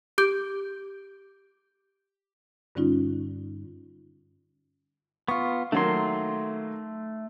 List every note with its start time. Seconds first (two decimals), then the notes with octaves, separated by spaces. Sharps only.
0.18 G4 D6 G6 D7
2.75 G2 D3 G3 C#4 D#4 F4
5.28 B3 F4 C#6
5.72 D#3 F#3 A3 A#3 C6